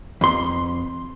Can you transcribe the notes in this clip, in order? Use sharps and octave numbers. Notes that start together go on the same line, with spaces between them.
F2 C6